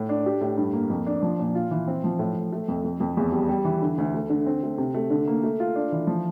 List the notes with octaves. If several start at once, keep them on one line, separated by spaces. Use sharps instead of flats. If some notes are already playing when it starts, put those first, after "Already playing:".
Already playing: A2
D4
G4
A2
G2
A#3
F2
D4
F3
A#2
F4
E3
C4
F3
A2
A2
A3
F2
F2
F2
E2
G3
G3
E3
D3
D2
A3
D3
C4
A3
C3
A3
D3
A#3
A3
F4
D4
E3
F3